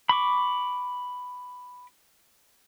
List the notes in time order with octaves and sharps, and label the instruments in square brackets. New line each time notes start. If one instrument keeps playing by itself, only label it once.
[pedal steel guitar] B5 C#6 D6